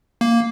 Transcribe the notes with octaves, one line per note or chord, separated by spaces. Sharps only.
A#3